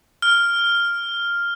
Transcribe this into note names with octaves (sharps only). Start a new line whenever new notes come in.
F6